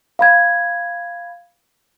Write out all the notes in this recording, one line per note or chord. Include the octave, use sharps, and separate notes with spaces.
F5 B5 G#6